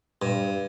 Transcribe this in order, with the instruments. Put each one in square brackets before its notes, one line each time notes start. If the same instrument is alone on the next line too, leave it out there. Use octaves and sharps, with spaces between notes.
[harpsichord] G2